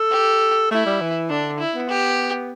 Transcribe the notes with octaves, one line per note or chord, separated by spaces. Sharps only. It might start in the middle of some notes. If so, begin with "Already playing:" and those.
Already playing: A4
G4
A3 E4
G3
E3
D3 D4
E4
B3
G4